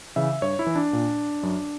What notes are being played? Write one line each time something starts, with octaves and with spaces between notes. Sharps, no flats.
C#3 E3 E5
G2 C#5
E4
E3
D4
A#2
F#2